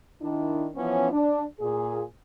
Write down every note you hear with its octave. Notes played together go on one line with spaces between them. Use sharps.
D#3 D4 E4
E3 F3 B3 C#4
D4
A#2 G#4